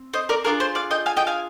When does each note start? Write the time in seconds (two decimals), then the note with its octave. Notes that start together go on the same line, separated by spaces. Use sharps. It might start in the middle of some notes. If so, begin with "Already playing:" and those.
Already playing: C4
0.14 C5 D#5
0.29 A#4 D5
0.44 D4 F4 G#4 A#4
0.60 C5
0.75 D5 F5
0.91 D#5 G5
1.06 F5 G#5
1.16 D#5 G5
1.27 F5 G#5